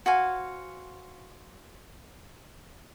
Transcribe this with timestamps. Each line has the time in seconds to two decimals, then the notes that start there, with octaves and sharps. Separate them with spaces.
0.06 F#4 C5 F5 G#5